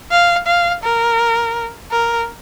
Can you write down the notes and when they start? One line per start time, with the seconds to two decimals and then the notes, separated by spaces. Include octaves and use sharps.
0.11 F5
0.47 F5
0.83 A#4
1.91 A#4